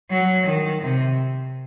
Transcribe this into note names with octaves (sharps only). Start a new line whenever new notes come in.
F#3
D#3
C3